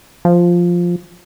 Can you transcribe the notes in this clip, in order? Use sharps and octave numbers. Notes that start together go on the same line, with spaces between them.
F3